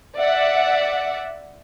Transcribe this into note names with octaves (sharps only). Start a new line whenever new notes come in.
D5 E5 F#5